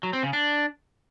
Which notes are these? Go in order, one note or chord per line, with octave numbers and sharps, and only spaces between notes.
F#3
C4
C#3
D4